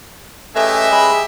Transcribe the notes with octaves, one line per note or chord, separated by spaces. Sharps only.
A3 C#4 G4 G#4 B4 D#5 E5 G#5
G#3 B5